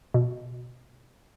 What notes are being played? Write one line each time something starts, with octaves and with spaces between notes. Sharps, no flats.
B2